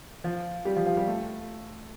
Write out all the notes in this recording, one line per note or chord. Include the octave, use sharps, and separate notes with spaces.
F3 F4
G3 G4
F3 F4
F3 F4
G3 G4
A3 A4